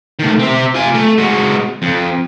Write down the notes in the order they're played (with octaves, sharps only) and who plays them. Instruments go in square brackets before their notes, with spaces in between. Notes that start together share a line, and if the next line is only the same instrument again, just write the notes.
[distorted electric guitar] D#3 A3
C4 E5
F4 G#5
A3
G#3 F#4
F2